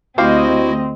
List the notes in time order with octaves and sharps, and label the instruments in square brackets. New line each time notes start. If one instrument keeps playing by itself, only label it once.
[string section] D2 D#5 [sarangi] C4 [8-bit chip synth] E4 F#4 [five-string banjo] G4 C5 F5